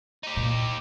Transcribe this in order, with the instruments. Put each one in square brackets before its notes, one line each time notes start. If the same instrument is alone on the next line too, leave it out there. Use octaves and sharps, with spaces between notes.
[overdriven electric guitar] D#4 G4
[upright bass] A#2